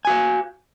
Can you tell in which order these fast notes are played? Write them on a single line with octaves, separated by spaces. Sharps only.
G#5 F#4 F5